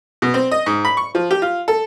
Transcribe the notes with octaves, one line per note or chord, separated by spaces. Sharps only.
B2
C4
D#5
G#2
B5
C#6
F3
G4
F4
A4